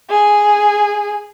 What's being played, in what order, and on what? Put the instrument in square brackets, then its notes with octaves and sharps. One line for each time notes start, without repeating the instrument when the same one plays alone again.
[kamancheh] G#4